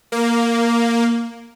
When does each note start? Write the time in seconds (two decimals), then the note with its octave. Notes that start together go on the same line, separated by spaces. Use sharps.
0.12 A#3